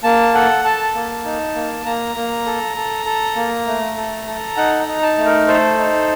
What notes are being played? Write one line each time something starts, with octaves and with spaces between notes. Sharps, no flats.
A#3 A5
A4 F#5
A4 A5
A#3
D#4
A#3
A#3 A#5
A#3
A4
A4
A4
A#3
A3
A4
A4
D#4 F#5
A#5
D#4
A5
A3
A#4
A4 C5
D#4